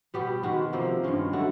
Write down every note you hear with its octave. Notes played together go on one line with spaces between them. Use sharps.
B2 G3 B3 G4
D#3 G#3 B3 F#4
C3 F3 A#3
G2 D#3 G#3 C#4
D3 F#3 A3 F#4